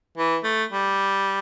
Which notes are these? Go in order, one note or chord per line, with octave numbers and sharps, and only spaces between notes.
E3
A3
G3